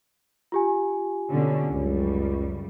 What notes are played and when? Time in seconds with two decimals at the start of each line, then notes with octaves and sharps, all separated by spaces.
0.52 F4 G4 G#5
1.30 B2 D3 C#4
1.71 C#2 F#2 C#3 G3